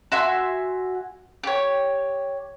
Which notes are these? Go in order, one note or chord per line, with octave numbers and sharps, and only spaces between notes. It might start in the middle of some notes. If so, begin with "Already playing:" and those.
F#4 E5 G#5 C6
G4 C#5